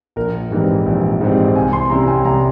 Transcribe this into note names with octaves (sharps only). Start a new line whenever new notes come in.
A#1 A#4
G#2 E3 G3 C4
A#1
G#2 E3 G3 C4
C2 G#5
C6
C3 G3 C#4 E4 A#5
G5
G#5
C2 A#5